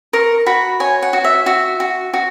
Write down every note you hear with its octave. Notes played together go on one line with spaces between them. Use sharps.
A#4 C#6
F#4 B5
C#5 G#5
F#5
F#4
E5
F#4 E5
F#4
F#4